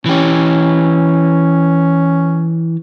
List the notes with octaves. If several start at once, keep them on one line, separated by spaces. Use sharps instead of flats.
E3 C#4 G4